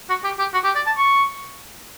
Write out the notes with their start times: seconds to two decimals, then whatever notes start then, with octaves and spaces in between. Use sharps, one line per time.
0.09 F#4
0.24 G4
0.39 G4
0.54 F#4
0.64 G4
0.75 D5
0.86 A5
0.98 C#6